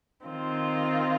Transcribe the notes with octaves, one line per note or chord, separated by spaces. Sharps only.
D#3 C4 F4